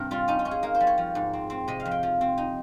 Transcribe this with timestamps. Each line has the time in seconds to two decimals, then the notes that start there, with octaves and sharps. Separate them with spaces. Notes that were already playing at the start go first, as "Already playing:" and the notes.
Already playing: G2 C3 A#4
0.11 G3 F4
0.28 C#4 D#4
0.39 F4
0.45 C#4
0.51 G#4
0.63 A#3 A#4
0.75 C5
0.80 G3
0.87 C#5
0.98 F3
1.15 G#2
1.33 C4
1.50 C4
1.68 C3 D#5
1.80 F5
1.85 F2
1.91 G5
2.03 F3
2.21 C4
2.38 D#4